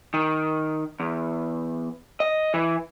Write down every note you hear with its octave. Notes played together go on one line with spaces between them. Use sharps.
D#3
E2
D#5
E3